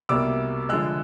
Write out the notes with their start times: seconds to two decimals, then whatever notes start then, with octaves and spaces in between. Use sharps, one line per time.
0.09 C2 B2 G3 A#3 D6 E6
0.69 D3 F3 G#3 E6 F#6